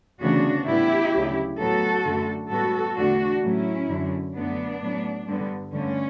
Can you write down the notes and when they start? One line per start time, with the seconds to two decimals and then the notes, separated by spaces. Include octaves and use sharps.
0.21 D2 C#3 E3 B3 D4 F#4
0.67 A2 G3 B3 E4 G4
1.13 D2 C#3 F#3
1.59 A2 F#3 B3 F#4 A4
2.05 F#2 D3 A3
2.51 A2 G3 B3 F#4 A4
2.97 E2 D3 A3 D4 F#4
3.43 A2 F#3 A3 C#4 E4
3.89 F#2 D3 F#3
4.35 F#2 D3 F#3 A3 B3 D4
4.82 A2 F#3 B3
5.28 G2 D3 G3 B3
5.73 G2 D3 A3 C#4